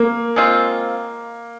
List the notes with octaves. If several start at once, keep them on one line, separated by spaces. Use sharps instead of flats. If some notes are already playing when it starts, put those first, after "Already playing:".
Already playing: A#3
G#3 C4 F4